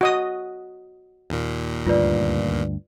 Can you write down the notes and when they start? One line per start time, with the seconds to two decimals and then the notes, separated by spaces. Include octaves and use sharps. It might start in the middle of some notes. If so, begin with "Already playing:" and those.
0.01 F#4 D#5 D#6
1.30 D#2 A#2
1.86 D2 G2 F4 B4 D5